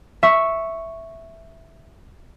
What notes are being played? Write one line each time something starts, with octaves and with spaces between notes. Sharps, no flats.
E5 C#6